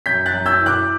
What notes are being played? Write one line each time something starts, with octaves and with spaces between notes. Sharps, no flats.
F#2 G6 B6
F#6 A6
F#2
E6 G6
E3
D6 F#6